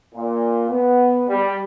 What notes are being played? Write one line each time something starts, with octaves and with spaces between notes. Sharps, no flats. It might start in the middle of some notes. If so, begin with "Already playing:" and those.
A#2
B3
G3